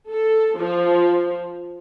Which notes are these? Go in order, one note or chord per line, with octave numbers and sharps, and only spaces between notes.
A4
F3